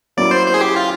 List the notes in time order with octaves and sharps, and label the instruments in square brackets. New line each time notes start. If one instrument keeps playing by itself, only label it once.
[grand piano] F#3 A#3 C#4 E4 [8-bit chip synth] D5
[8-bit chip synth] C5
C5
G#4
G4
F4